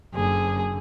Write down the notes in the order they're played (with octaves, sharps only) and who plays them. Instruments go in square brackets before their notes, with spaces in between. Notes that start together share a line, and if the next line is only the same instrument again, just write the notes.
[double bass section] F#1 D3 [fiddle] G#4